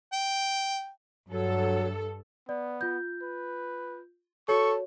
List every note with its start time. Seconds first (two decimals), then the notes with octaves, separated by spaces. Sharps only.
0.13 G5
1.30 G2 F#3 A4
2.49 B3 D5
2.81 F4 G6
3.22 B4
4.49 F#4 A4 C#5 C#6